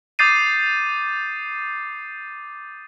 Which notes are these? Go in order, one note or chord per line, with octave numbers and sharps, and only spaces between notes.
D6 D#6 G6 A6 C7 D#7